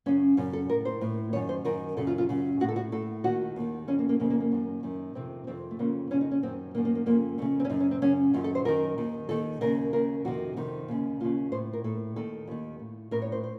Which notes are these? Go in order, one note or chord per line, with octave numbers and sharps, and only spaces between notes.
F#2 C#3 C#4
F#2 C#3 C#4
A4
A2 A#4
C5
A2
F#2 D#3 C#5
C5
F#2 D#3 A#4
F#2 C#3 A4
F4
F4
F#2 C#3
A2 F#4
A4
F#4
A2 A4
D#2 D#3 F#4
D#2 D#3
F2 C#3 C#4
A#3
A#3
F2 C#3 A#3
A#3
A#3
F#2 D#3
F#2 D#3
F2 C3 D#3 C4
F2 C3 D#3 C4
A3
F2 C#3 A#3
F2 C#3 C#4
D#4
C#4
F#2 D#3 C4
F#2 D#3 A#3
A#3
A#3
F2 C#3 A#3
F2 C#3 A3
C4
C#4
F#2 C#3 D#4
C#4
C4
F#2 C#3 C#4
F#2 D#3 F4
A4
C5
F#2 D#3 A#4
D#2 D#3
D#2 D#3 A4
D#2 C#3 A#4
D#2 C#3 A#4
F2 C3 D#3 F#4
F2 C3 D#3
D#2 C#3
D#2 C#3 F4
A2 C5
A#4
A2 A4
D#2 D#3 A4
D#2 D#3
A2
A2 A#4
C#5
C5
C5